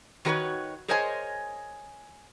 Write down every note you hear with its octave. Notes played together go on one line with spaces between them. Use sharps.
D#3 F#3 F#4 A#4 B4 C#5
G#4 A#4 C5 C#5 D#5 G#5